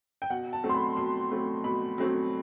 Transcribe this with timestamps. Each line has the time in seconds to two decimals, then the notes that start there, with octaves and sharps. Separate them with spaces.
0.22 G5
0.30 B2 F#5
0.53 A5
0.64 F#3 A3 C4
0.69 C6
0.75 B5
0.97 B2 C6
1.31 F#3 A3 C4
1.64 B2 B5
1.98 F#3 A3 C4